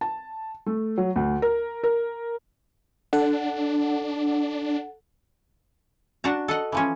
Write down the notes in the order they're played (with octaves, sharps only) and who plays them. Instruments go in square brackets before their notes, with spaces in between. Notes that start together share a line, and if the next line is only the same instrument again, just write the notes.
[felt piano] A5
A3
F#3
D2
A#4
A#4
[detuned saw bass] D4 [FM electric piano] A4 F#5
[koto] D4 F#4 A5 A#5
A4 D#5 F#5
E3 F3 C#4